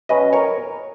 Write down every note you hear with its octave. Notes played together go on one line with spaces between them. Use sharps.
B2 F#3 C#4 B4 D#5
A#4 C#5